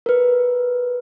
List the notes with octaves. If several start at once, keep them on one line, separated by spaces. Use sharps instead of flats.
A#4 B4